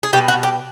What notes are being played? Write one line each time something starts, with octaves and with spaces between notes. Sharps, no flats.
G#4
B2 G3 G4
F#4
G4